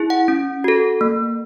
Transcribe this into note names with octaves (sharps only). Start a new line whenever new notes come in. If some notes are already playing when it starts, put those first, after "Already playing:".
Already playing: E4 G#4
F#5
C#4
F#4 A4
A#3